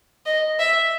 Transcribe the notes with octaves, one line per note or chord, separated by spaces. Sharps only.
D#5
E5